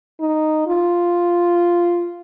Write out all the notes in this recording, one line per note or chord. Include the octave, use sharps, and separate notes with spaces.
D#4
F4